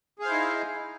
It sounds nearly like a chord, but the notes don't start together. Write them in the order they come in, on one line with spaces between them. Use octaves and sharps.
G#4 F5 C5 E4 D#4